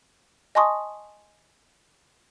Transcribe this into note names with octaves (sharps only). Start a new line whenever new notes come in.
D#5 G#5 A5 C6 C#6 D#6